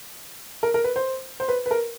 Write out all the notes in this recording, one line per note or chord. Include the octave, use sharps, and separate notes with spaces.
A#4
A#4
B4
C5
C5
B4
B4
A#4